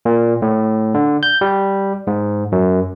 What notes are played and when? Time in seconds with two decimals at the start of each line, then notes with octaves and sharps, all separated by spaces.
0.05 A#2
0.42 A2
0.94 D3
1.23 G6
1.41 G3
2.07 G#2
2.52 F#2